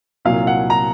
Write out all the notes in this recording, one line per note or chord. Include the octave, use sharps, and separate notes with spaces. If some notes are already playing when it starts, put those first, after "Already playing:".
C2 A#2 F#3 F5
F#5
A#5